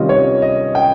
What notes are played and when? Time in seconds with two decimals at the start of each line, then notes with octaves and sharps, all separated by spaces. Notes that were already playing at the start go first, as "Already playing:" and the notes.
Already playing: C3 D#3 G3 C#4 F4 D#5
0.09 C#5
0.42 D#5
0.75 G5